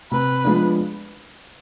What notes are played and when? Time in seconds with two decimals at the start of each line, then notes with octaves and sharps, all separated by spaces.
0.11 C3 B4
0.44 F3 G#3 B3 D4